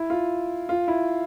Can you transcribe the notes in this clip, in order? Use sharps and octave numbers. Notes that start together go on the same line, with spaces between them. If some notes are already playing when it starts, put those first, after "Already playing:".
Already playing: E4
F4
F4
E4